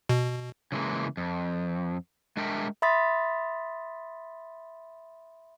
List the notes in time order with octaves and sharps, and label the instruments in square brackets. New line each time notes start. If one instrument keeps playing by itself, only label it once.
[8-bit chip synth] B2
[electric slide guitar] C#3 E3 G#3 A#3
F2
G#3 D4 A#4 E5 G5
[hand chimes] E5 B5 C6 D#6 A6 B6